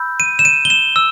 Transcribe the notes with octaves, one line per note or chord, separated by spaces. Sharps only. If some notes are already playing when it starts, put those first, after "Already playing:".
Already playing: B5 E6 G6
D#7
E7
D#7
G7
E7
E6